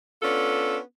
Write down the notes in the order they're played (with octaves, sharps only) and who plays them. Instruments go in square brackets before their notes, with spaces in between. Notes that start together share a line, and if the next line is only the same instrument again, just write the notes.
[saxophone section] B3 C#4 D4 F4 A4